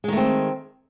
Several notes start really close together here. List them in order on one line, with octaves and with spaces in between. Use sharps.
G#3 D#3 A3 C4